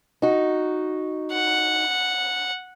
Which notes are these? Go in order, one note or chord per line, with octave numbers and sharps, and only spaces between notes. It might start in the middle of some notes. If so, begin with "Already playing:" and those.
D#4 F#4
F#5